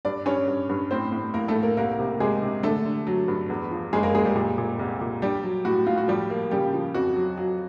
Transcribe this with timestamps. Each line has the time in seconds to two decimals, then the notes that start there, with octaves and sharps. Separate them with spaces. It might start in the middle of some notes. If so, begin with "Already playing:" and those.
0.05 G2 D4 D5
0.26 G2 C#4 C#5
0.48 G2
0.69 G2
0.91 A2 C4 C5
1.12 A2
1.34 A2 A#3 A#4
1.48 A3 A4
1.56 A2
1.63 A#3 A#4
1.77 C2 A#3 A#4
1.99 C3
2.20 C3 G#3 G#4
2.42 C3
2.63 D3 A3 A4
2.85 D3
3.07 F#3
3.28 G2
3.50 E2
3.71 F3
3.93 F#1 G#3 G#4
4.03 A#3 A#4
4.14 F#1 G#3 G#4
4.25 G3 G4
4.35 A#2
4.58 A#2
4.79 C2
5.01 A#2
5.22 G3 D4 G4
5.43 F#3
5.65 A2 F#4
5.86 A2 F4
5.98 F#4
6.08 F3 G3 G4
6.30 A#3
6.51 C#3 G3 G4
6.73 F3
6.94 F2 F#4
7.16 F#3
7.37 F#3